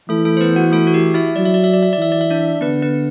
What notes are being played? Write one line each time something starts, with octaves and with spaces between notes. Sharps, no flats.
E3 A3 A4
A3 A4
C5
B3 B4
F#4 F#5
A3 A4
F#4
G4
E4 E5
F#3 D5
E5
D5
E5
D5
E5
D5
E3 E5
D5
E5
D4 D5
D3 B3 B4
B3 B4